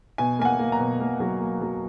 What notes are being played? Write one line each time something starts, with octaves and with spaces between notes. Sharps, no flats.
B2 G#5
A#3 G#5
F#5
A#3
A#5
B2
A#3
F#3
A#3
F#3